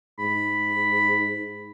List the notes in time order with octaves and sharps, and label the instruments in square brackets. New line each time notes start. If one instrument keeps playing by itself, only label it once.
[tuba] G#2 [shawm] B5